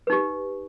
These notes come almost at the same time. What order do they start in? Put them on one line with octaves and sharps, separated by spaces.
B4 D#4 G4